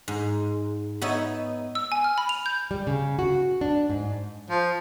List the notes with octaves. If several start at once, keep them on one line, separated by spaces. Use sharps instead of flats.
G#2
B3 D#4 C#5 E5
E6
G#5
F6
B5
F7
G6
G3
C#3
F#4
D4
G#2
F3